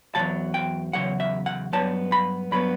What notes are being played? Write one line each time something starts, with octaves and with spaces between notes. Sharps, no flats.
E2 C#3 F#3 A5
G5
E2 C#3 F#3 F#5
E5
F#5
G2 F#3 B3 A5
B5
G2 F#3 B3 B5